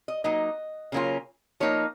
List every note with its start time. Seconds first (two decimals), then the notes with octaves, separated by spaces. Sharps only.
0.08 D#5
0.24 F#3 A#3 D#4 D#5
0.92 C#3 F#3 A#3 C#4 F4
1.60 F3 A#3 D#4 C#5